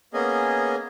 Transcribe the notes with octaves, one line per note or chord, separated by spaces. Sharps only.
A#3 B3 C#4 G#4 D#5